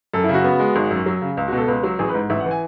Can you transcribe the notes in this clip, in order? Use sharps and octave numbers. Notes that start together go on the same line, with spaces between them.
F#2 A4
E4
C#3
F#4
B3
G#3
G#1
F#2
F#3
C#3
C#2
F#4
B2
A4
C#2 B4
F#3
A1 G#4
B4
G#2
A1 E5
F#5
E3
G#5